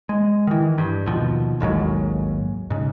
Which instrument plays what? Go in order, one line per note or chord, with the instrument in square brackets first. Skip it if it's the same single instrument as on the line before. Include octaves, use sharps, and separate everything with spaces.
[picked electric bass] G#3
D#3 E3
G2
D#2 B2 F3
A1 D#2 G#2 F#3
G#2 C#3